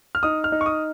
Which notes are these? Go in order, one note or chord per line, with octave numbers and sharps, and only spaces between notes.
F6
D#4 D#6
F6
D#4
C#6
D#6